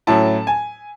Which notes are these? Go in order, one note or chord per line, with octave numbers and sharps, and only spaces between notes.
A2 F#3 C#4 E4 A5
G#5